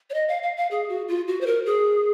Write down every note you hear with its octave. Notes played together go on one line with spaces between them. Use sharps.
C#5
D#5
F5
F5
F5
G#4
F#4
F4
F#4
C5
A#4
G#4